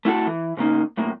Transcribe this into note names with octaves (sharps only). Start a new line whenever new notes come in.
A3 E4 F#4 A4
E3
G#2 C#3 A#3 D#4
B1 A2 A#3